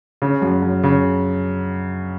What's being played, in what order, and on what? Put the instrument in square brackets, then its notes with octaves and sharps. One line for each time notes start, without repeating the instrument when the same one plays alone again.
[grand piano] C#3
F#2
F#2
C#3